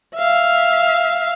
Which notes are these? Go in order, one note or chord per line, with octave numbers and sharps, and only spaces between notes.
E5 F5